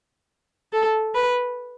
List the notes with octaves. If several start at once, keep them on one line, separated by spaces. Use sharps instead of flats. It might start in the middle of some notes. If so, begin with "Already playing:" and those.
A4
B4